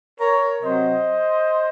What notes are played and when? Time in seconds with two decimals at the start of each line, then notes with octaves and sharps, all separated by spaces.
0.20 A#4 C#5
0.63 C3 F#3 C4 C5 D#5